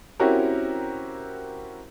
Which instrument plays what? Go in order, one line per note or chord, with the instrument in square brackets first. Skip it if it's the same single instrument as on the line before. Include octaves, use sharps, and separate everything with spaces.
[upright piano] C4 C#4 E4 F#4 G4 A#4